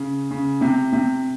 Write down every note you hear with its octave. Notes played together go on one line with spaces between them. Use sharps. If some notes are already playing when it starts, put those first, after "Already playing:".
Already playing: C#3
C#3
C3
C3